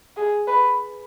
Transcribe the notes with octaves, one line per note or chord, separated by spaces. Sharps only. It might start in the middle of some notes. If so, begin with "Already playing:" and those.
G#4
B4